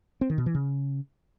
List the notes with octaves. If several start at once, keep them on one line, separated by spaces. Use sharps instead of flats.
C4
D#3
B2
E3
C#3